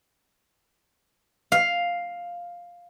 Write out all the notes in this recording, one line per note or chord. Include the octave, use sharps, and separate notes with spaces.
F5